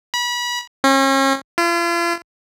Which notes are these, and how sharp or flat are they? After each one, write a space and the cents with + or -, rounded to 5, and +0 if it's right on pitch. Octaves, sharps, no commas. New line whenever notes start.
B5 -30
C#4 -40
F4 -40